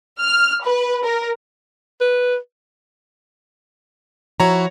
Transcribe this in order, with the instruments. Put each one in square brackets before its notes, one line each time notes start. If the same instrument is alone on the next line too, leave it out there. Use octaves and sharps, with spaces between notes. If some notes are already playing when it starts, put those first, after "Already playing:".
[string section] F6
B4
A#4
[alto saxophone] B4
[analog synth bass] F3 [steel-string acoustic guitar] E4 F#4 [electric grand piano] C#5 A#5